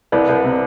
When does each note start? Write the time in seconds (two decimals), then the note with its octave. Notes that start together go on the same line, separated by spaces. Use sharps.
0.12 C2 B4 D5
0.29 C2
0.44 C3